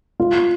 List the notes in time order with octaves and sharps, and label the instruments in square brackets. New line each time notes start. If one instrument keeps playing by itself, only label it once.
[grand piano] F4